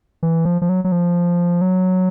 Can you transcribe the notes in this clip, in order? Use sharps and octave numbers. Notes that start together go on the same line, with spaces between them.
E3
F3
F3
F#3
F#3
F3
F#3